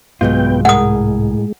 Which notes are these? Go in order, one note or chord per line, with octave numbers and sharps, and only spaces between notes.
C2 G#2 F#3 G#3 B3 F4 G5
A2 G#3 G#4 A#4 F#5 D#6